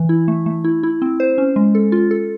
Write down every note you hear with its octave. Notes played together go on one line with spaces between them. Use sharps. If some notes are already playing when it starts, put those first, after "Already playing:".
Already playing: E3
E4
A3
A3
E4
E4
C4
C5
C#4
G#3
A4
F4
A4